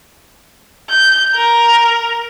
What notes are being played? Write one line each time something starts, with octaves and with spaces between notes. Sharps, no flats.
G6
A#4